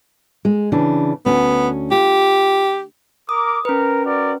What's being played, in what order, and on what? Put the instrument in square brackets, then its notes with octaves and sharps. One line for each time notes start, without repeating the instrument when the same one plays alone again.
[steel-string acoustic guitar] G#3
C#3 E3 D4
[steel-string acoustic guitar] D2 C#4 [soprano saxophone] B3
[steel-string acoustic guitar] F4 [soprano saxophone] G4
[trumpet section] A#4 D6 [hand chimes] D#6
[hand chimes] C#4 B4 [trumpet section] A#4
[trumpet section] F#4 A#4 D5